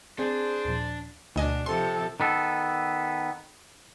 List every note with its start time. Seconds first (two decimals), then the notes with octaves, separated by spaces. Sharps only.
0.19 C4 D4 G#4 C5
0.65 D#2 A#2 F3
1.36 D2 B2 D4 D#5 G#5
1.66 C3 F3 A4 C6
2.20 D#3 B3 A4